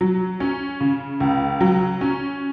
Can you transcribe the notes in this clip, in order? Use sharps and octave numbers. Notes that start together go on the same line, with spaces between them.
F#3
C#4
C#3
C#2
F#3
C#4